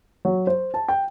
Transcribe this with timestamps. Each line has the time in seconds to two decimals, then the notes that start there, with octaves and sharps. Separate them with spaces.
0.25 F#3
0.47 C5
0.74 A5
0.88 G5